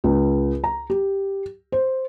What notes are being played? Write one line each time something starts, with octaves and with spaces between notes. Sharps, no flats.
C#2
A#5
G4
C5